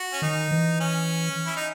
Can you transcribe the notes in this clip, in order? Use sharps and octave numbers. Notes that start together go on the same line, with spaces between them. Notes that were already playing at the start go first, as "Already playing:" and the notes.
Already playing: F#4
C#4
D#3 D#4
E3
C#4
E4
D#4